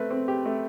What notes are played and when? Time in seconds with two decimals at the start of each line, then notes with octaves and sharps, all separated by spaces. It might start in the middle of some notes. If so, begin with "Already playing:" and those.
Already playing: A3 C4 B4
0.11 C4
0.28 G4
0.45 A3